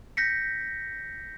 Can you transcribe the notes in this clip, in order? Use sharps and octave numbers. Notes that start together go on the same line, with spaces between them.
G6 A#6 B6 C#7